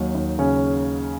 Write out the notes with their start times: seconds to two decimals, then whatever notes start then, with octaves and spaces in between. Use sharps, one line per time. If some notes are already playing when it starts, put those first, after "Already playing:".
Already playing: D#2 F#3 D#4
0.15 D#2
0.39 C#3 C#4